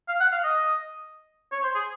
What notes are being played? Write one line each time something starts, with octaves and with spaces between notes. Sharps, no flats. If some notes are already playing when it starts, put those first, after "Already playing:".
F5
F#5
F5
D#5
C#5
C5
G#4